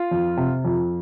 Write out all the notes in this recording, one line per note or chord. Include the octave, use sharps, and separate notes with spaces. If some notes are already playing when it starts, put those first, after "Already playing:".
Already playing: F4
F2
C3
F2